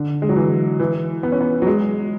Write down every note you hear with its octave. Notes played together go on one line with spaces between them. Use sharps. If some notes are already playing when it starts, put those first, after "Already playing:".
Already playing: D3
G#3
F#3
E3
E3
B3
C#4
B3
F#3
G#3